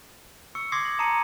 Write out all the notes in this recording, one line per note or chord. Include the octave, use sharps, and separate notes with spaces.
C#6 E6 C#7
C6 D6 D#6 G#6 A#6 C7
F#7
A5 A#5 D#6 C7 C#7 D#7